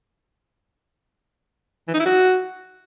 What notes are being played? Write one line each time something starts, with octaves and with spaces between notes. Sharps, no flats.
E3
D#4
E4
F#4